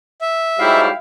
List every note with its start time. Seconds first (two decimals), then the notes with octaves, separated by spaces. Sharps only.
0.21 E5
0.60 G#2 F#3 G3 E4 F5 G5